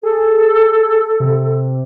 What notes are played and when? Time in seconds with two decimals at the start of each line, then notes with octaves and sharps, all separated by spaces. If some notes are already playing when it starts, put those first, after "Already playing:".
0.03 G#4 A4
1.20 C3